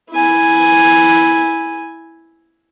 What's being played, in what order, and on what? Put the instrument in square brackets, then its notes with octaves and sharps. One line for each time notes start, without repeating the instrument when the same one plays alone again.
[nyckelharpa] E4 G#5